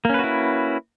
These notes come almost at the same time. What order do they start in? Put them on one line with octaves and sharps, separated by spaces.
A#3 C#4 B4 F#4 E4